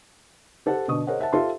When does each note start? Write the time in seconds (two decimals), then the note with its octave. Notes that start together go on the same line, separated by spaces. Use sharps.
0.66 G4 A4 C5 F#5
0.88 B2 D3 C#6 D#6
1.07 G#4 A#4 C5 C#5 D#5 F#5
1.19 C5 E5 F#5 A5
1.33 F4 G4 A4 C5 E5 C6